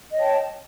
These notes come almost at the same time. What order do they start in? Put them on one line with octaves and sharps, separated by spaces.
D#5 C#5 G5 A5